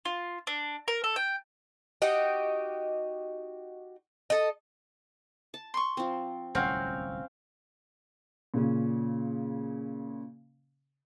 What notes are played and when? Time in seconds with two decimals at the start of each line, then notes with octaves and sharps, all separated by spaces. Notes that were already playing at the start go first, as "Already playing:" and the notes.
0.05 F4
0.47 D4
0.88 A#4
1.04 A4
1.16 G5
2.02 D#4 F#4 G4 D#5
4.30 A4 D#5
5.54 A5
5.74 C6 C#6
5.97 F3 C4
6.55 D1 C2 C4 C#4 F#4 F5
8.54 A#2 C#3 C#4